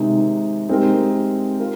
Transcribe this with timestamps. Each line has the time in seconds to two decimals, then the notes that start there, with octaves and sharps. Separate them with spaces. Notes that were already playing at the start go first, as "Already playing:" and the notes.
Already playing: C3 D#3 G#3 D#4
0.69 G#3 C4 D#4 G4 A#4
1.59 F4 A#4